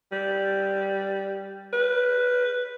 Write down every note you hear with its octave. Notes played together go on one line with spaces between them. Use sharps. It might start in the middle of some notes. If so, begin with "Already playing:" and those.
G3
B4